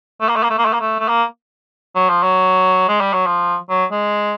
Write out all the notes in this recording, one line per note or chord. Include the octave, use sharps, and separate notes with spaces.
A3
A#3
A3
A#3
A3
A#3
A3
A#3
A3
A3
A#3
F#3
F3
F#3
G#3
G3
F#3
F3
F#3
G#3